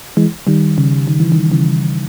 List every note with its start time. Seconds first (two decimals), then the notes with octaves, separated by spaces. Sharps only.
0.17 E3 G#3
0.47 D#3 G3
0.78 C#3
1.07 D#3
1.20 E3
1.32 D#3
1.52 C#3 E3